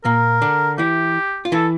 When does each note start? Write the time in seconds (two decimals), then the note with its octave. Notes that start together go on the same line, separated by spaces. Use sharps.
0.05 A#2 A#3 A#4
0.42 D3 D4
0.78 E3 E4 G4
1.45 F4
1.52 E3 E4 A4